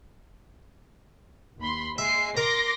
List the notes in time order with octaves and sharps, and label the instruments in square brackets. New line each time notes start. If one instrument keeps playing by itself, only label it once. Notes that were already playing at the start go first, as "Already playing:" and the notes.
[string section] D#2 B5 C6
[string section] G#3 C7 [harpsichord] E5
[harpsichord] A#4 A#5 [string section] C6 D6 A#6